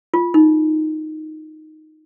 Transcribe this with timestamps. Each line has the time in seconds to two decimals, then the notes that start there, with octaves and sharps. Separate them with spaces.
0.14 F4
0.34 D#4